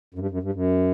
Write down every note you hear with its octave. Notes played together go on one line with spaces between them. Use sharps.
F#2
G2
F#2
G2
F#2